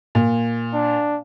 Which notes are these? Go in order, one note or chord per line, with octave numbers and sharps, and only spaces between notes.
A#2
D4